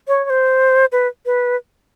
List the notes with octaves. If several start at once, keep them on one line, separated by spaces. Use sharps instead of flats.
C#5
C#5
C5
B4
B4